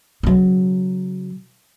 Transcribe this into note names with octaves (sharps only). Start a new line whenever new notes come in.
C#3 F#3